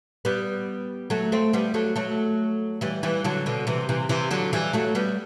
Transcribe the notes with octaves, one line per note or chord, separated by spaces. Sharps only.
G3 B3
F#3 A3
A3 C4
G3 B3
F#3 A3
F#3 A3
E3 G3
E3 G3
D3 F#3
B2 D3
C3 E3
C3 E3
C3 E3
D3 F#3
E3 G3
F#3 A3
G3 B3